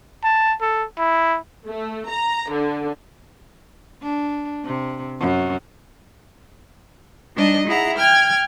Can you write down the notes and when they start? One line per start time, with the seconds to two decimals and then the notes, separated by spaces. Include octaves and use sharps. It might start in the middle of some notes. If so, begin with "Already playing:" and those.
0.24 A5
0.61 A4
0.98 E4
1.68 A3
2.09 A#5
2.53 D3
4.02 D4
4.65 C3
5.19 F#2
7.35 G3 D4 D#4 D#5
7.67 E4 G#4 F#5 A#5
7.97 G5 F6 G#6